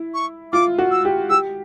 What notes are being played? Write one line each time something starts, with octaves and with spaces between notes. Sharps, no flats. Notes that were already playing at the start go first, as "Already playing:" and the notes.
Already playing: E4
C#6
F4 D6
F#4
E6
G4
G4 E6